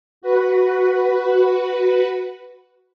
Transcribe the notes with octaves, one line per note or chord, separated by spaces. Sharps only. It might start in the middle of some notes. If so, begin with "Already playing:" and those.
F#4 B4